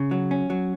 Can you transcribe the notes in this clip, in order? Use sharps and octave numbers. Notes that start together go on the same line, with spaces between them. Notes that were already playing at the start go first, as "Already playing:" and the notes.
Already playing: C#3
F#3
C#4
F#3